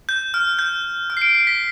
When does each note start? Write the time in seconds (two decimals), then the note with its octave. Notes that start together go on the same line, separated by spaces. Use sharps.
0.09 G6
0.34 F6
0.59 G6
1.10 F6
1.17 C7
1.22 D7
1.34 C7
1.47 B6